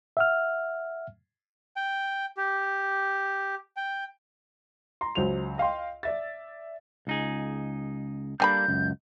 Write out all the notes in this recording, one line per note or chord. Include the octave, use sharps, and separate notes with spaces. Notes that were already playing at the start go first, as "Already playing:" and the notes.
E5 F#5 F6
G5
G4
G5
A#5 C6
C#2 F#3 C5 F7
D#5 F5 G5 C6
D5 E5 A6
C#2 D#4 G#4
D3 G3 A#3 D4 G#5 B5 G6
C#2 F#2